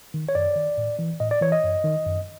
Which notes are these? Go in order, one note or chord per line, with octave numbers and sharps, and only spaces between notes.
D#3
C#5
F#2 D5
D#3
A2
E3
A2 D#5
D5
E3 C#5
D#5
F#2
D#3
F#2